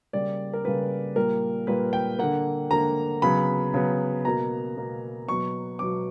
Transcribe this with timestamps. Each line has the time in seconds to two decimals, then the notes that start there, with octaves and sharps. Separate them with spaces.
0.13 C#3 G3 A#3 D5
0.53 A#4
0.65 C#3 G3 A#3 B4
1.16 A#2 G3 A#3 A#4
1.67 A#2 G3 A#3 B4
1.93 G5
2.19 D3 A#3 F#5
2.71 D3 A#3 A#5
3.22 C#3 F#3 B3 B5
3.74 C#3 F#3 B3
4.25 B2 A#3 A#5
4.77 B2 A#3
5.28 B2 F#3 B3 C#6
5.79 B2 F#3 B3 D6